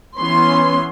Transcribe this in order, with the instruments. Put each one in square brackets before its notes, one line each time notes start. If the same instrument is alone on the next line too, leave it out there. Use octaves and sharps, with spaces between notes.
[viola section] E3 B3 C#4 C6